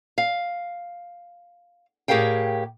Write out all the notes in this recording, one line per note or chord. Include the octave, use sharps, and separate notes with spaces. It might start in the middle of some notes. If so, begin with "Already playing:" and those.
F5
A2 G4 G#4 A#4 F5 G5